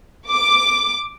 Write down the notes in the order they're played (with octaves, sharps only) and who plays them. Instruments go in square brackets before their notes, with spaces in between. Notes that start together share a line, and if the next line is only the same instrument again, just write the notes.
[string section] D6